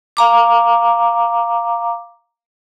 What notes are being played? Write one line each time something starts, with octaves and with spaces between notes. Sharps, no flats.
F5 A#5 D6